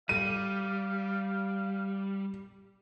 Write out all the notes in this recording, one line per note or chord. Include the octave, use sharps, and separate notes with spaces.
G3 F5 D#7